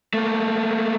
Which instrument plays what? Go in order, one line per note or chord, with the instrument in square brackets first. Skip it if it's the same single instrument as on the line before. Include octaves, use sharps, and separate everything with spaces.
[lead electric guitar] A3 A#3